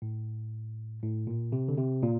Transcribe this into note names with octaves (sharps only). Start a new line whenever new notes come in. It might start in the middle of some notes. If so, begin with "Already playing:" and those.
A2
A2
A#2
C3
D3
C3
A#2